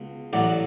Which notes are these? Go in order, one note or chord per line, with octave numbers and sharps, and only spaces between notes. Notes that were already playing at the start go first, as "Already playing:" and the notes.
Already playing: C#2 B2
A1 A2 F#3 D5 F#5